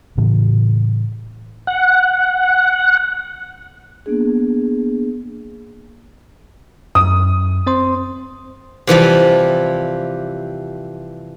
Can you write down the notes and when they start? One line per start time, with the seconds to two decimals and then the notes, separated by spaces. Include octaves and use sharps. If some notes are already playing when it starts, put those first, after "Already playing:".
0.17 A2 C#3 E3 A#3
1.67 F#5
4.06 A#3 B3 D4 G#4
6.95 F#2 D#6
7.67 C4 C5 C6
8.87 C3 E3 F3 G3